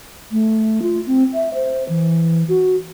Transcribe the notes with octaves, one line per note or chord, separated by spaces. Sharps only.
A3
F4
C4
E5
C5
E3
F#4